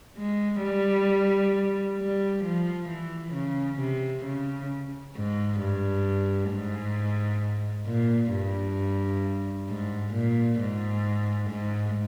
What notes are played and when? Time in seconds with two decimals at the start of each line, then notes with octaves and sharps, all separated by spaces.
0.17 G#3
0.63 G3
1.99 G3
2.44 F3
2.89 E3
3.34 C#3
3.79 C3
4.25 C#3
5.16 G#2
5.60 G2
6.51 G#2
7.87 A#2
8.33 G2
9.69 G#2
10.14 A#2
10.60 G#2
11.50 G#2